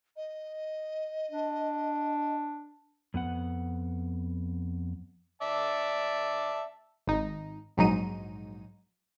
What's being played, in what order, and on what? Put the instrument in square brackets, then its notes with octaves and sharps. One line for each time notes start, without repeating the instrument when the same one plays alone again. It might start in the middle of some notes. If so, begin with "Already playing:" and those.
[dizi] D#5
[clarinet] D4
[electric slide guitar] F2 B3 F#5
[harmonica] D5 E5 A5
[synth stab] G#1 D#4
A#1 G#2 F#3 D#4 D#7